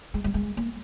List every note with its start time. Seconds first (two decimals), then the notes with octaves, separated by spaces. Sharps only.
0.14 G#3
0.24 G3
0.34 G#3
0.57 A#3